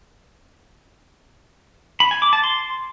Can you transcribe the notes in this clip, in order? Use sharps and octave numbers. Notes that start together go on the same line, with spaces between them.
B5
G#5
D6
A5
C6